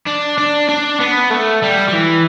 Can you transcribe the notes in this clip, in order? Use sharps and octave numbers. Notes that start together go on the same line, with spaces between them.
D4
D4
D4
B3
A3
G3
G3
E3